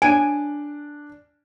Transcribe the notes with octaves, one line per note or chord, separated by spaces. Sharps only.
D4 G#5 D7